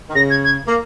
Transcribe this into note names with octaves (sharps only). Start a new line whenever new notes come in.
D#3
C#3 A#6
G#6
G#6
A#3